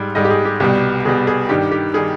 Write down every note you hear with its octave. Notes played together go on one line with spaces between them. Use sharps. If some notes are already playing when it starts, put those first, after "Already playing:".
Already playing: G#2 G3
G#2 G3 D#5
G4
G#4
G4
C2 B2 G3 G4
C2 B2 G3 G#4
G#4
G2 D#3 G3 G4
G4
D#3 G3 G#4